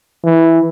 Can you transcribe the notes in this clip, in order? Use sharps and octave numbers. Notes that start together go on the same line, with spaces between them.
E3